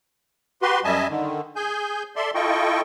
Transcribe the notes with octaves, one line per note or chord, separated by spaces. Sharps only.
F#4 G4 B4 C6
F#2 G3 D#5 E5 G#5 A5
D3 D#3
G#4 G#5 G6
A4 D5 E5 C6
E4 F4 A4 D#5 G5 C#6